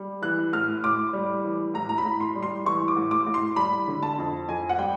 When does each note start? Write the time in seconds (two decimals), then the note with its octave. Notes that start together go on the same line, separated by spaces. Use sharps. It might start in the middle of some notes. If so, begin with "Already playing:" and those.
Already playing: G3
0.22 E3 F#6
0.53 A2 F6
0.84 A2 D6
1.13 G3
1.44 E3
1.74 A2 A#5
1.89 A#5
1.98 B5
2.05 A2
2.20 C6
2.35 G3
2.43 C6
2.65 E3 C#6
2.88 D6
2.96 A2
3.11 D6
3.26 A2
3.34 C6
3.56 G3 B5
3.88 D3
4.03 A5
4.18 F2
4.48 F2 G#5
4.69 F#5
4.78 G3 G5